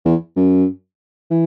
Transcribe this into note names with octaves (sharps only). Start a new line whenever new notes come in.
E2
F#2
E3